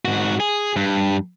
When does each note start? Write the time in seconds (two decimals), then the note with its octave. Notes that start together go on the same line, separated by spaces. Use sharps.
0.05 G#2 F#4
0.40 G#4
0.76 G2